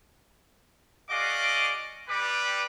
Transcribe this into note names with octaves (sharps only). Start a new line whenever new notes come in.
F#4 G#4 D5 D#5 F5 D6
G3 B4 D6